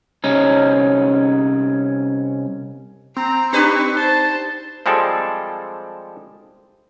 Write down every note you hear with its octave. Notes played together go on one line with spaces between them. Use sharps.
C2 C#4 D#4
C4 A#5
D4 D#4 G4 B4 C#6
C5 A5
F3 G3 G#3 C4 A4 D5